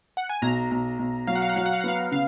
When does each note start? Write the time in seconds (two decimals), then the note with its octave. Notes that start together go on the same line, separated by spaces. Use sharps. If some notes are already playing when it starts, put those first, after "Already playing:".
0.17 F#5
0.29 G#5
0.42 B1 A#5
0.71 B1
0.99 B1
1.27 F#3 F5
1.35 F#5
1.42 F5
1.49 F#5
1.56 F#3 F5
1.66 F#5
1.73 F5
1.81 F#5
1.84 B3 F5
2.12 C#3 F5